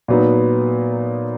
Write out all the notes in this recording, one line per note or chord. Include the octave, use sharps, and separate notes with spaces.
A#2 F#3 B3 D#4